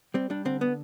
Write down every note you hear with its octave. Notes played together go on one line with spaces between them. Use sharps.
G3 C4
G3 D4
D3 C4
B3